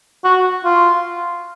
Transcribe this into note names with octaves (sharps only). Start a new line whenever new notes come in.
F#4
F4